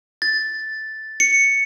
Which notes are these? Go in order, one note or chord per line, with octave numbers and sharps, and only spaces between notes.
A6
C#7